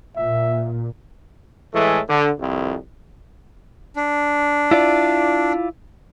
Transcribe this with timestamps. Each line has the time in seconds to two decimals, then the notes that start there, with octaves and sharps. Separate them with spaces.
0.17 A#2 E5
1.75 A2 E3 G#3 A3
2.09 D3
2.40 C2 F2
3.96 D4
4.71 E4 F4 D5